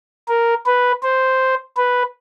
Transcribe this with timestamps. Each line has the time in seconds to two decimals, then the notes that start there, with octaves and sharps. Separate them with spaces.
0.29 A#4
0.66 B4
1.03 C5
1.77 B4